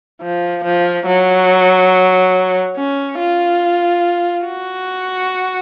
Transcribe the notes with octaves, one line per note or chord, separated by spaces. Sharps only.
F3
F3
F#3
C#4
F4
F#4